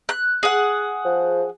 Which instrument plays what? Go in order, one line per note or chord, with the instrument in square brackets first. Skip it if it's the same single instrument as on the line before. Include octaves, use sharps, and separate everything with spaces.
[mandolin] F#6
G#4 F#5
[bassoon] F3